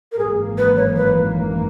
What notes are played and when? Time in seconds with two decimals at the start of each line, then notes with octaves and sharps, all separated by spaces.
0.12 A#4
0.19 G#1 F#2 E3 A#3 G#4
0.58 B4
0.77 C#5
0.96 B4